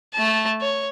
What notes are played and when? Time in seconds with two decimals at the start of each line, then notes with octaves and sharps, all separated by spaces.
0.14 A3 A5
0.61 C#5